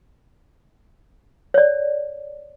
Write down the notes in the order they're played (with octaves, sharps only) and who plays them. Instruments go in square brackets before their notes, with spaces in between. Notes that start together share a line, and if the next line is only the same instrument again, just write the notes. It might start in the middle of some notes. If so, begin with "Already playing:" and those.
[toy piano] C#5 D5